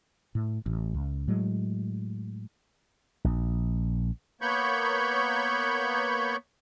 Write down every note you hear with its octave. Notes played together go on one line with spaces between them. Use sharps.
A2
A1
C#2
A2 F#3 G#3
A#1
A#3 B3 C#5 B5 C#6 G6